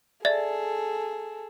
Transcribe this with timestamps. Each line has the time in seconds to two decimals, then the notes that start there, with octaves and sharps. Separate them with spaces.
0.25 G#4 A4 D5 E5 A6